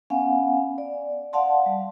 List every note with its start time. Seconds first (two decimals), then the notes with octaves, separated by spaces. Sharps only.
0.10 B3 C#4 F5 F#5 G#5
0.78 D5
1.33 D5 F5 F#5 A5 C6
1.66 G3